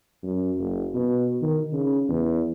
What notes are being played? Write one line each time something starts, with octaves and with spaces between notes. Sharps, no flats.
F#2
F#1
B2
D#3
C#3
E2